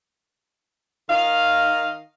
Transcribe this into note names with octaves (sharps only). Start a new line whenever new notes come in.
D#3 D#5 F5